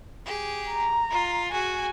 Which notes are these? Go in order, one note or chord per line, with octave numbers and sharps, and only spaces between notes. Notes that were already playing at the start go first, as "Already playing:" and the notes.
G4 G#4
A#5
F4
F#4 G#4 G#5